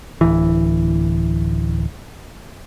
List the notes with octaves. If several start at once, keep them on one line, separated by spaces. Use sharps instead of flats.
D1 E3